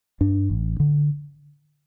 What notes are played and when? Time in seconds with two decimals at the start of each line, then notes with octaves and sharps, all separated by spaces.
0.21 G2 D4
0.50 A1
0.80 D3